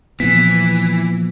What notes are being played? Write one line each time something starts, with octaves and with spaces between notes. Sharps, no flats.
A#2 E3 F3 B3 B6